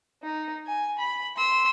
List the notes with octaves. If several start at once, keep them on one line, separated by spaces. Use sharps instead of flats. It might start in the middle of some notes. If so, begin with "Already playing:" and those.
D#4
G#5
B5
C6 E6